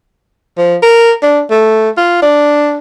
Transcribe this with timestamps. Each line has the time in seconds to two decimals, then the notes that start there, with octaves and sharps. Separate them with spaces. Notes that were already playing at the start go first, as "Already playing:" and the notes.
0.58 F3
0.82 A#4
1.23 D4
1.50 A3
1.97 F4
2.22 D4